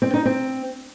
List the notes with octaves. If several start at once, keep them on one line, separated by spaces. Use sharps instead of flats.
C4
D#4
C4